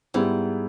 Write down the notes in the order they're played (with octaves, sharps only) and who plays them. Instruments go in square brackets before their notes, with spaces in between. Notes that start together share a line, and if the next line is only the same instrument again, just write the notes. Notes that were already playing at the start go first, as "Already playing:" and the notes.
[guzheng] G#2 [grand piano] G3 B3 E4